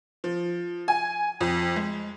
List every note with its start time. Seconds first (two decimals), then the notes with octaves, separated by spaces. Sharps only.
0.24 F3
0.88 G#5
1.41 F2
1.76 G#3